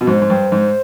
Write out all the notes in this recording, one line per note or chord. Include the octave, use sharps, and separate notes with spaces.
B2
G#2 C5
G#2
G2
G#2